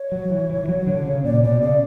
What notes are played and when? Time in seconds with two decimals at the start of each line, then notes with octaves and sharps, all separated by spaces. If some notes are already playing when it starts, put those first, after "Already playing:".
Already playing: C#5
0.12 F#3
0.30 E3
0.50 E3
0.64 E3
0.68 F#3
0.87 D3
1.05 C#3
1.24 A#2 D5
1.43 B2 D5
1.62 C#3 D5